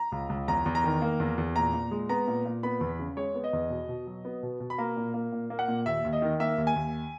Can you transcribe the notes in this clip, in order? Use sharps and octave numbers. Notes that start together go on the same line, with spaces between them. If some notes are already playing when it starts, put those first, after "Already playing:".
Already playing: A#5
C#2
C#2
E2 A#5
E2
A#5
D#3
A#3
E2
E2
A#2 A#5
A#2
G#3
B3 A#5
A#2
A#2
B3 B5
E2
C#3
G#3 C#5
B3
D#5
E2
B2
B2
F#3
B3
B2
B2
B5
A#3 A#5
A#2
A#3
A#2
A#3
F#5
A#2
D#2 E5
D#2
D#5
D#3
A#3 E5
D#2
G#5
D#2